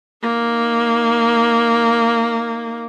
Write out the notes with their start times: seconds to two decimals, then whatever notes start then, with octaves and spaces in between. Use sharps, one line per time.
0.23 A#3 D#4